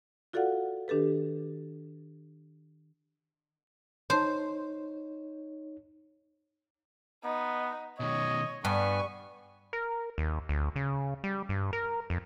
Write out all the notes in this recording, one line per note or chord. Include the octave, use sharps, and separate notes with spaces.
F4 F#4 A4 D5 F5 F#5
D#3 D4 G4 A4 B4
D#4 C5 C#5
B3 D#4
B2 D#3 C#5 D#5
G2 B3 G#5 C#6
A#4
D#2
D2
C#3
G3
G2
A#4
F2